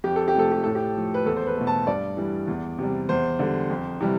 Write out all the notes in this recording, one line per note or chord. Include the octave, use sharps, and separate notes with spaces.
F2 G4
A4
G4
C3 F3 A3 A4
G4
A2 A4
G4
F3 A3
B4
E2 A4
C5
B4
B2 A3
A5
G2 D5
E3 G3
E2
C3 G3
E2 C5
D3 G3
F2
C3 E3 G3